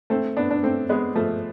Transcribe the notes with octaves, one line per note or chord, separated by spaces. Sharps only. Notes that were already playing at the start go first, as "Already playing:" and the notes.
A3 C4
B3 D4
D4
A3 C4
G#3 B3
F3 A3